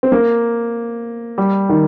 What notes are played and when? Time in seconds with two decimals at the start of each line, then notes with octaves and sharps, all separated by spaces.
0.03 C4
0.12 A#3
1.38 G3
1.69 D#3